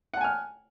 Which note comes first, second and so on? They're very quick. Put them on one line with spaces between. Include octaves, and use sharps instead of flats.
F#5 A5 G#5 F6